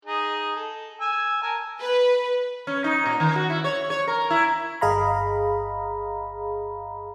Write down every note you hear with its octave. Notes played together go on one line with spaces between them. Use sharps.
D#4 G#4
A4
G#5 E6
A#4 G#5 A5
B4
C#4
D#4
A#2
D#3
F#4
E4
C#5
C#5
A#4
E4
G1 G#4 D#5 F5 A#5 B5